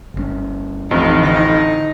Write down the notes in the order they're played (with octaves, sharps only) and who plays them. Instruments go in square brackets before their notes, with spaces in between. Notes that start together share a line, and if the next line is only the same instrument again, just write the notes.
[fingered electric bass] G1 D3 C#4
[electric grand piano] A1 F2 [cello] D#4
[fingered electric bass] D3 [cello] D#4